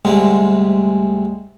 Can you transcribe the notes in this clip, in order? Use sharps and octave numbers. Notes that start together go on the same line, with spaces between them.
D2 G#2 C3 G3 G#3